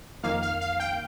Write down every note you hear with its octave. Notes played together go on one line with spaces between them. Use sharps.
F2 D#3 A#3 F5
F5
F5
G5